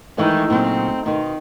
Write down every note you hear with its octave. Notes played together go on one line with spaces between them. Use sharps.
D#3 E3 G#3 A3 D#4
A#2 C#3 F#3 C4
B2 D#3 F4